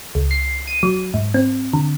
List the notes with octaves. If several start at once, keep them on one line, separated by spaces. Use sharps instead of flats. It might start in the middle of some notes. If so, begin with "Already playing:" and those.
C#2
C7
D#7
F#3
G#2
C4
D3